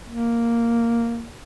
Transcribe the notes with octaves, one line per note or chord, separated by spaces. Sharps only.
A#3